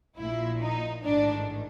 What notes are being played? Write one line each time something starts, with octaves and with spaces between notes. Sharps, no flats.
A#1 A#2 E4
D#4
A1 G#2 D#3 D4